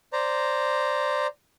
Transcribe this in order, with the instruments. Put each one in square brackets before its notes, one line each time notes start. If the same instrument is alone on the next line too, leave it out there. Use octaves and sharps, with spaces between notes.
[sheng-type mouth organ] C5 D5 A#5